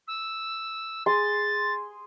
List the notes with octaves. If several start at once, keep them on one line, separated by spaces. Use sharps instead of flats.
E6
G#4 C6 A6